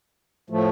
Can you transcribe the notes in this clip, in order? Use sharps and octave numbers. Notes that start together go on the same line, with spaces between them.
A2 F3 A3